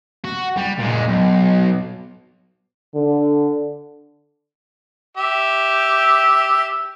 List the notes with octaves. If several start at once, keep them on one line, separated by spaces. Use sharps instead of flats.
F#4
G3
A#2 G#3
B1
D3
G4 E5